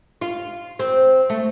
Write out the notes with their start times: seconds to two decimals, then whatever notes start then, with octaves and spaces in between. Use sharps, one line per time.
0.21 F4
0.79 C4
1.30 A3